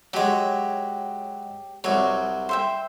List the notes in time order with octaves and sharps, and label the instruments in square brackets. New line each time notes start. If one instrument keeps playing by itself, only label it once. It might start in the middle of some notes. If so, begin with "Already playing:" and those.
[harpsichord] F#3 G#3 [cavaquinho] G4 C#5
[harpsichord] C2 F#3 [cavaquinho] C#5
[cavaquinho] C5 E5 G5